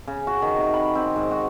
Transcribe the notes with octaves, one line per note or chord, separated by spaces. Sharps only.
C#3
F#4
D#3
C3
B5
C4
G#2
F#4